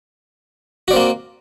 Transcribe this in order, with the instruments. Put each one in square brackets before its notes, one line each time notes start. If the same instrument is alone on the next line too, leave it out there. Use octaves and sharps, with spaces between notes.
[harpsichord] F#4
D5
C4
A#3